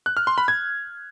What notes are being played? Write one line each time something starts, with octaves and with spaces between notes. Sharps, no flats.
F#6
F6
C6
B5
G#6